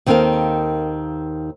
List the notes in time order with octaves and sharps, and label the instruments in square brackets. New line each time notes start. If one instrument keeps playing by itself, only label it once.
[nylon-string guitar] D#2 D#3 C4 A4 A#4 F5